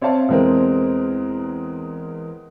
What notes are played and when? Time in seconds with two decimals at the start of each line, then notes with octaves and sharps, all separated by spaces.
0.02 C4 C#5 D5 E5 F5 A5
0.29 E2 G#3 C4 A#4